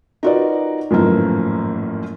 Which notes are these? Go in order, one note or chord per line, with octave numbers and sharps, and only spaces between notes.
D#4 F4 F#4 A#4 B4 D5
G#1 F#2 A2 E3 F3 A#3